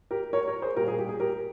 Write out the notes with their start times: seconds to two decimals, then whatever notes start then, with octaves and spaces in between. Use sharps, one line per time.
0.11 G4 A#4
0.33 A#4 C#5
0.48 A#4 C#5
0.62 G#4 C5
0.77 A#2 G3 G4 A#4
0.88 G#4
0.99 G4
1.09 G#4
1.20 G4 A#4